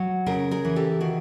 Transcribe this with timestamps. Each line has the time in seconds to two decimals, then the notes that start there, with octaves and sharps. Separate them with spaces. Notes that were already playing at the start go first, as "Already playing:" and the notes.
Already playing: F#3
0.26 C#3 G#4 A#4
0.51 G#4 A#4
0.65 E3
0.76 G4 A4
1.01 D#3 F#4 G#4